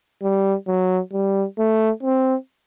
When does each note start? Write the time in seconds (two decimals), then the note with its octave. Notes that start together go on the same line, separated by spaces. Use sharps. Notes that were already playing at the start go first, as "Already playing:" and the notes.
0.23 G3
0.68 F#3
1.13 G3
1.59 A3
2.03 C4